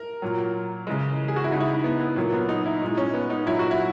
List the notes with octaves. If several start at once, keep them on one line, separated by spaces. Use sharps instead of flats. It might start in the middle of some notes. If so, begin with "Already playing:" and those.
Already playing: A#4
A#2 F#3
C#3 E3 G#3
G#4
F#4
E4
C#3 G#3 D#4
E4
D#4
B3
B3
A#2 F#3 A#3
B3
D#4
E4
A#2 G#3 D#4
C#4
B3
D#4
A#2 F#3 E4
F#4
E4